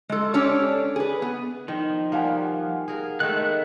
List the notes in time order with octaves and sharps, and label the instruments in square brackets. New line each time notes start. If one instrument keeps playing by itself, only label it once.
[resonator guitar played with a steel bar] G#3 A4
C#4 D4 G4 A4 C#5
G#4 B4
B3
[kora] D#3 [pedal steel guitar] F3
[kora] G3 A#3 [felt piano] F5 F#5 G#5
[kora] G#4 A#4
[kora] D#3 G#3 A3 [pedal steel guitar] B3 F#6